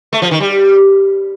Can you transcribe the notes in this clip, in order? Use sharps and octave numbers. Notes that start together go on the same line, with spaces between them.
A3
F3
D#3
G3